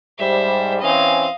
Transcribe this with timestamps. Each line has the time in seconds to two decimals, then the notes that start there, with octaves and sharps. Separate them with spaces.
0.19 G#2 G3 C5 E5
0.81 E3 C4 C#4 D#5 F5